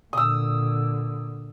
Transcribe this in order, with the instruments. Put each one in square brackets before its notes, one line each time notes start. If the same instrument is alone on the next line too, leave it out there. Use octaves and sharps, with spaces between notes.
[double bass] A#2 D3 [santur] D#6 E6